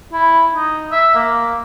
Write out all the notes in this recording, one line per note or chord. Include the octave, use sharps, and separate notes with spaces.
E4
D#4
E5
A#3